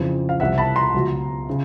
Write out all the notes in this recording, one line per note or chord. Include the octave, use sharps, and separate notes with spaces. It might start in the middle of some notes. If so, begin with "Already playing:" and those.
Already playing: F2 C#3 E3
F5
C2 C3 E3 E5 F#5
A5 B5
A#5 C6
C#2 B2 F#3
C#3